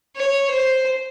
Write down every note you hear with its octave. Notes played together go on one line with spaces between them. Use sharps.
C#5
C5